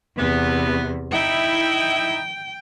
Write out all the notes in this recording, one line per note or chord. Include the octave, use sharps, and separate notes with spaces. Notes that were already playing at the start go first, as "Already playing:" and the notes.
E2 C3 E3 B3
D#4 E4 G5